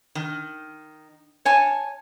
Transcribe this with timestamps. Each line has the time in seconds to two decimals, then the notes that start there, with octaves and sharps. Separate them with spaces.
0.15 D#3
1.45 C#5 G#5 A5